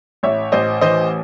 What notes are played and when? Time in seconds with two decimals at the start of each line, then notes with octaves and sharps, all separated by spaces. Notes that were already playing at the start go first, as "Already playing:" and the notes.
0.23 A1 C#5 E5
0.52 A1 C5 D#5
0.81 E3 C5 D#5